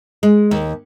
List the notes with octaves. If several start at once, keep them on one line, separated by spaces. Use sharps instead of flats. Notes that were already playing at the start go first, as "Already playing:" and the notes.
G#3
D#2